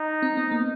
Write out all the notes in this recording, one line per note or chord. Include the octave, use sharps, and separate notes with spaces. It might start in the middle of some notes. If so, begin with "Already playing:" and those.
Already playing: D#4
C4
B3
A#3